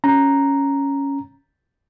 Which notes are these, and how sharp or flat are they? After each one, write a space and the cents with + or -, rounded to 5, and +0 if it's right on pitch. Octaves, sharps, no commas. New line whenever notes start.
C#4 +0 A#5 +0